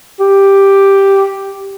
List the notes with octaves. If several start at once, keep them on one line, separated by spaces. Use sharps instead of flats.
G4